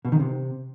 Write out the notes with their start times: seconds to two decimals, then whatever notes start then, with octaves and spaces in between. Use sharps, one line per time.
0.05 B2
0.12 D#3
0.20 C3